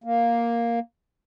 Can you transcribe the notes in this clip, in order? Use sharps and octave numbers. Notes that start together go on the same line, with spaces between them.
A#3